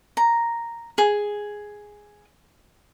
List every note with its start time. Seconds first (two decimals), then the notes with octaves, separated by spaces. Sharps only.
0.17 A#5
0.98 G#4